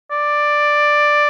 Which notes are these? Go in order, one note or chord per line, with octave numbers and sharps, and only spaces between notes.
D5